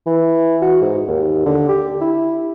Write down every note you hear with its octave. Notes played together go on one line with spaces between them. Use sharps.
E3
F#4
G#2
D#2
D3
G4
E4